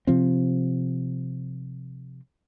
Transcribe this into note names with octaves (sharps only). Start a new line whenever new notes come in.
C3 F3 C4